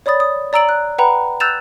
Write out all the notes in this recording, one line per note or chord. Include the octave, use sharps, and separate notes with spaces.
C#5 D5 B5 D#6 A6
D#6
D5 A#5 E6 D7 F#7
F#6
B4 F#5 G5 A#5 B5
E6 F#6 G6 A6 E7 F7